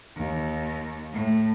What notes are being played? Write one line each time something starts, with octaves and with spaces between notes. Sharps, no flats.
D#2
A2